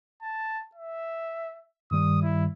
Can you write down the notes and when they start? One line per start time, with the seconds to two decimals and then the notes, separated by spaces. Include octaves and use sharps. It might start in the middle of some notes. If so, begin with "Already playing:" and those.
0.22 A5
0.75 E5
1.91 G2 D#3 G3 D#6
2.22 E4